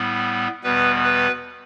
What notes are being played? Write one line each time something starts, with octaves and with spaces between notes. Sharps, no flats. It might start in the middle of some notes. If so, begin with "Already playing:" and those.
Already playing: A2 G3 B3
E2 B2 G3 B3 B4
B4